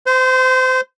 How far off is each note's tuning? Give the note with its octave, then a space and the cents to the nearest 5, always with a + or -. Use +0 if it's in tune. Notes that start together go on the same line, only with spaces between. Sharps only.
C5 -25 C6 +0